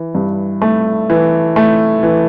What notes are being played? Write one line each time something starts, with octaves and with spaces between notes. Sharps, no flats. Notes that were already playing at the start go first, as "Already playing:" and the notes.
Already playing: E3
G2
A3
E3
A3
E3